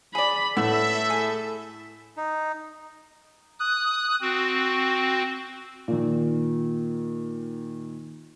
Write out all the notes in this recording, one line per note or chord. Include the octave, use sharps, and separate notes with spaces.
G#4 D5 B5
A2 B3 A4 E5
G#4
D#4
D#6 F#6
C4 F#4
A#2 D#3